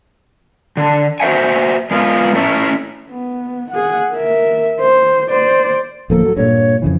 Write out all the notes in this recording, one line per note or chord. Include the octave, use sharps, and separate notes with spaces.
D3
F#4 C5 E5 F#5 G#5
G#3 B3 F4
A3 C#4 E4
B3
G#4 F#5
A#4 E5
C5
C5 D5
D1 F3 A#3 A4
F#3
G2 A#2 C#5
F2 C#3 E3